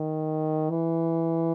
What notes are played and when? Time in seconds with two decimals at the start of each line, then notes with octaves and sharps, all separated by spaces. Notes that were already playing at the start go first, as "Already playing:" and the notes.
Already playing: D#3
0.70 E3